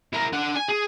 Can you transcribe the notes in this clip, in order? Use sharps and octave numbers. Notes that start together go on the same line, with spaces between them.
E4 A#4
D4 F#5
G#5
G#4